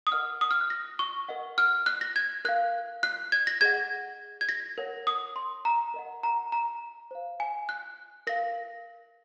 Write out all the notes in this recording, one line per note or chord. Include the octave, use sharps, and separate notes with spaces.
D#6
A#4 D#5 F#5 F6
D#6
F6
F#6
A#6
C#6
A#4 D#5 F#5
F6
F#6
A#6
G#6
A#4 F5 F#6
F#6
G#6
A#6
G#4 D#5 F#5 G#6
G#6
A#6
A#4 C#5 F#5
D#6
C6
A#5
A#4 D#5 F#5
A#5
A#5
C5 F5
G#5
F#6
A#4 F5 A#6